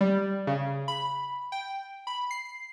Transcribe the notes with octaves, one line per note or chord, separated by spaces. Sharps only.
G3
C#3
B5
G5
B5
C7